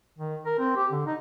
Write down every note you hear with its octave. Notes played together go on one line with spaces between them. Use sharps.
D#3
A#4
C4
G4
D3
D#4